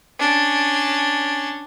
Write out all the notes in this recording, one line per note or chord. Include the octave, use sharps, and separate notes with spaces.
C#4 D4